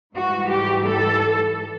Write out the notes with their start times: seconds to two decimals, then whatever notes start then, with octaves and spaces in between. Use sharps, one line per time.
0.14 G#2 E3 G3 F#4
0.50 G4
0.84 A4